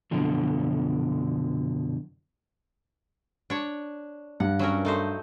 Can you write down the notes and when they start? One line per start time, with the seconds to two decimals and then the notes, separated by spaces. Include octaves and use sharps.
0.11 F#2 B2 D3 F3
3.50 D4 C#5
4.40 G2 F#5
4.59 F#3 C#4 A#4
4.85 A3 D#4 C5